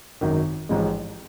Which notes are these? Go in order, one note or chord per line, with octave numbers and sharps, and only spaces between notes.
G#1 F#2 D#3
A1 G#2 F3 G#3